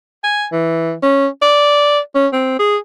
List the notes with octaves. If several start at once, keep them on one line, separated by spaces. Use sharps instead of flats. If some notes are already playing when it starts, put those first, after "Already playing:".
G#5
E3
C#4
D5
C#4
C4
G#4